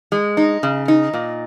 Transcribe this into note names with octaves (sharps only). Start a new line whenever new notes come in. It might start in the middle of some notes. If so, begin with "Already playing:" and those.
G#3
D#4
C#3
D#4
A#2